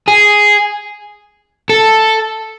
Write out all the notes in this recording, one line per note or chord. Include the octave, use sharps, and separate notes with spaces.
G#4
A4